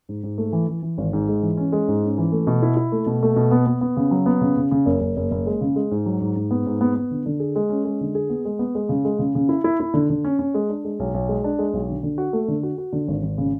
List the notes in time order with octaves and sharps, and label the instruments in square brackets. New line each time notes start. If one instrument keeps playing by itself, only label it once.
[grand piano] G#2
G#2
A3
E3
E3
E3
G#1
G#2
G#3
E3
C#4
G#3
G#2
C#4
E3
A3
B2
E4
E4
A3
B2
A3
B2
B3
B3
B3
C#3
F#3
B3
C#3
C#3
C#3
F#1
F#1
F#1
F#1
G#3
C#3
G#3
G#2
F#3
G#2
G#2
B3
G#2
B3
B3
D3
D3
G#4
G#3
C#4
G#3
D3
G#4
B3
G#3
B3
G#3
C#3
G#3
C#3
C#3
E4
E4
E4
D3
D3
C#4
C#4
G#3
D4
G#3
B1
B1
G#3
D4
G#3
B1
D3
D3
F#4
A3
D3
F#4
F#4
D3
G#1
G#1
C#3